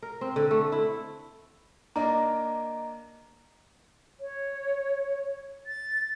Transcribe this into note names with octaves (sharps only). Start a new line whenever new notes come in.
A#4
C4
D3
A3
E4
A#3 D4 D#5 A#5
C#5
A6